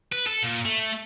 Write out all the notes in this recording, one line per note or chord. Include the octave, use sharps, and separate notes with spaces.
B4
A4
A#2
A3